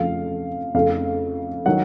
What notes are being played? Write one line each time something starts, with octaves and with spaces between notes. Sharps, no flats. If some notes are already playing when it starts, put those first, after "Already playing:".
Already playing: F2 C#3 F3 A3 F5
F2 C#3 A3 F5
D#3 F#3 F#5